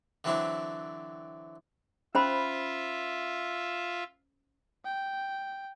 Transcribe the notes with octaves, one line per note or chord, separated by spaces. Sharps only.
D3 E3 F#3 C4 D4 E4
C#4 F4 C5 E5 B5
G5